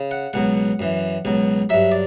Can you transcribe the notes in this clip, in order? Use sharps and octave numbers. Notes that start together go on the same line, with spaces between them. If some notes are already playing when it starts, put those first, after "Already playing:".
Already playing: C#3
F#5
C#2 B2 F#3 F#5
F#2 E3
C#2 B2 F#3
G2 F#3 E5
D5